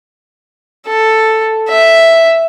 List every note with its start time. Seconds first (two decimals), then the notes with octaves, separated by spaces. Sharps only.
0.87 A4
1.69 E5